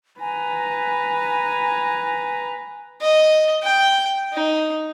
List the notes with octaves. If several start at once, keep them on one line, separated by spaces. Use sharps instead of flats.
B4 G#5 A#5
D#5
G5
D#4